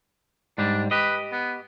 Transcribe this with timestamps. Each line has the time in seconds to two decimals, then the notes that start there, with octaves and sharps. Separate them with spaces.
0.58 G#2 G3 D4
0.91 G4 B4 D#5
1.32 B3